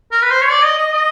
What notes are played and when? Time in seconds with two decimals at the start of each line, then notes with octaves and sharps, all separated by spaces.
0.12 A#4
0.22 B4
0.31 C5
0.41 C#5
0.50 D5
0.64 D#5
0.78 D#5
0.93 D#5